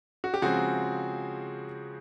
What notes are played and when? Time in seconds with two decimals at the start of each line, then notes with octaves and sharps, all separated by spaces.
0.24 F#4
0.34 G4
0.42 C#3 F3 G#3 C4 F#4 G#4